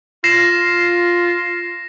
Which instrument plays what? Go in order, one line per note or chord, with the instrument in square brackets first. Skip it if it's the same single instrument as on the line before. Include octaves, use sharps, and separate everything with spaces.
[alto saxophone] F4 [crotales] A#6 C7 E7